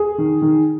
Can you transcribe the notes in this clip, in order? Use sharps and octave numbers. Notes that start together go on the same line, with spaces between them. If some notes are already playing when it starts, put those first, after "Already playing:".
Already playing: G#4
D#3
D#3